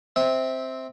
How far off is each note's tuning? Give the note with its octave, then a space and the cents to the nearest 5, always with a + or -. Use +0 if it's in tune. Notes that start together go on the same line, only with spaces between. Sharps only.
C4 +0 E5 -20